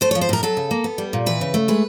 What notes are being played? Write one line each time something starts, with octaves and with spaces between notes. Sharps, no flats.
A3 C5
C#5
F3
C5
A2 A#4
F#3 A4
C#3
A#3
B3
G3
A#2
E3 B4
C#3
A3
G#3 B4